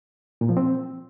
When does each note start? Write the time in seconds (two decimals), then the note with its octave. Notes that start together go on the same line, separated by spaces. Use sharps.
0.41 A#2
0.49 F3
0.57 C4